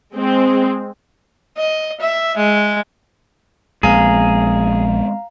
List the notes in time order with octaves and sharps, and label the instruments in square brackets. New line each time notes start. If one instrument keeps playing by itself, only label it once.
[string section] G#3 C4
[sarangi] D#5
E5
G#3
[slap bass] A#1 [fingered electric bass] G#3 B3 C4 [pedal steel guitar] G#4 [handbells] F5 A#5